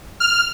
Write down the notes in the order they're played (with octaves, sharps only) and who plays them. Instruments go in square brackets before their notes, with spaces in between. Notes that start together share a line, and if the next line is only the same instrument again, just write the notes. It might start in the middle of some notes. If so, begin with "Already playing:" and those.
[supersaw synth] F6